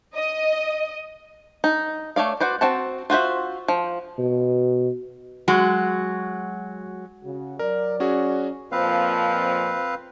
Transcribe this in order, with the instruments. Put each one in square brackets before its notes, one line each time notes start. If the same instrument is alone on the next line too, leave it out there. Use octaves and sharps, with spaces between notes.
[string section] D#5
[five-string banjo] D#4
A3 C#5 D5 F5
F#4 B4 C5 D5
C4 F#4 A5
F4 F#4 C5 E5
F3
[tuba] B2
[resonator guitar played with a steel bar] F#3 G#3 F#4
[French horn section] C#3 F#4
[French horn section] F#3 D5 [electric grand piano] A#4
[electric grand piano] C#4 F#4 G#4
[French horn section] F2 A#2 F3 [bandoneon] C4 B4 F5